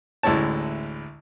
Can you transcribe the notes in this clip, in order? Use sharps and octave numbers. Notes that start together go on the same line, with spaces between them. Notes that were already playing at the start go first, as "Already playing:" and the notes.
A1 D2 G#3 E4 C#5 A5